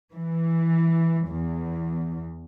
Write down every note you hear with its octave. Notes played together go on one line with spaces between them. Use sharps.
E3
E2